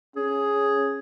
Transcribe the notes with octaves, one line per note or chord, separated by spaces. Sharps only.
C#4 G#4